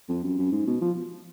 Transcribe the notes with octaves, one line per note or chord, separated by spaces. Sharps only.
F2
F#2
F#2
G#2
B2
F3